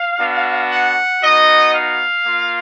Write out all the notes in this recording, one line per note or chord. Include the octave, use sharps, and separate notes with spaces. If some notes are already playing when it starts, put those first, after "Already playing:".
Already playing: F5
B3 D4 F#4
F#5
B3 D#4 F#4 D#5
F5
A#3 F4